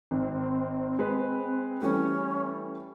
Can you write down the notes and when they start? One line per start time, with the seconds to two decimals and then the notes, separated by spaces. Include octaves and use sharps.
0.11 G#1 C4
0.99 G#3 B4
1.82 E3 G3 A3 C#4